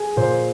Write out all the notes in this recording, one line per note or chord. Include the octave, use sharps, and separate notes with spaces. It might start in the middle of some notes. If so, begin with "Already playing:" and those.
Already playing: G#4
A#2 C5